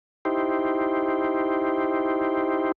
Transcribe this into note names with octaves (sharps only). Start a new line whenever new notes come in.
D#4 E4 G4 C5